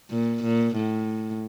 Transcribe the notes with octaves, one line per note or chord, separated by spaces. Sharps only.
A#2
A#2
A2